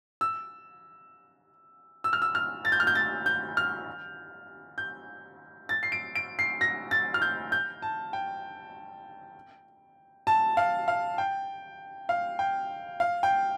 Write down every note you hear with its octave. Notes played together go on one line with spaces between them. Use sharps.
E6
E6
F6
E6
F6
A6
G6
F6
G6
A6
G6
F6
G6
A6
C7
D7
D7
C7
A#6
A6
F6
G6
G6
A5
G5
A5
F5
F5
G5
F5
G5
F5
G5